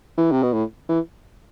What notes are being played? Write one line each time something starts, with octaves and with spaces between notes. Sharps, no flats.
E3
C3
B2
A2
E3